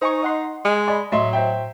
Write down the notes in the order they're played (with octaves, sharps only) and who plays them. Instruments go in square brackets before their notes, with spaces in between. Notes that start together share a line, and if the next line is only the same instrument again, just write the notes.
[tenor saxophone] D#4 [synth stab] C5 G#5 C#6
[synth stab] D#5 F#5 C6
[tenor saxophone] G#3
[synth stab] D5 G#5 B5 [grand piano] D#5
[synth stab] A2 [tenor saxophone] F#3 [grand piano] D#5 E5 C6
[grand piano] C5 E5 G5